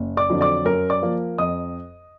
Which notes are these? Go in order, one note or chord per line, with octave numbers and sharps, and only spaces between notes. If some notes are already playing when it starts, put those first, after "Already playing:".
Already playing: F#1
D5 D6
F2 D3 F#3
D5 D6
F#2 A#4 A#5
D5 D6
F3 A#3
F2 D#5 D#6